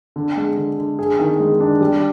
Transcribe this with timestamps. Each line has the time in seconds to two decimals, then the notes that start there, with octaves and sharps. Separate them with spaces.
0.16 D3
0.37 G#3
0.57 D3
0.78 D3
0.99 G#4
1.19 D#3
1.40 G#3
1.60 D4
1.81 G3